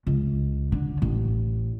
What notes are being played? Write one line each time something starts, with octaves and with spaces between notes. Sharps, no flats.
C#2
D3
A1